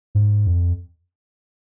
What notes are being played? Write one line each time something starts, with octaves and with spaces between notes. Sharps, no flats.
G#2
F2